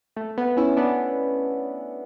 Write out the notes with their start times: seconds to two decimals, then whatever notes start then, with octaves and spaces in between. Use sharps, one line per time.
0.16 A3
0.38 B3
0.57 C#4 E4
0.77 B3 D4